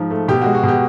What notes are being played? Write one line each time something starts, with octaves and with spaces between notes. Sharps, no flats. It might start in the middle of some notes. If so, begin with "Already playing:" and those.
Already playing: G#2 F3
A3
B2 G4
F#4
G#3
F#4
B2 G4